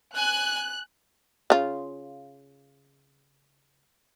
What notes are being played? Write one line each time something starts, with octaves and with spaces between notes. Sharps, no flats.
G#5 F#6
C#3 F4